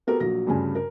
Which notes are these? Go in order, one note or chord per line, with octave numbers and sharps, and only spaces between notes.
B3 F#4 G4 A4 A#4
A#1 F#3 A#6
D2 G2 C#3 G#5
A#4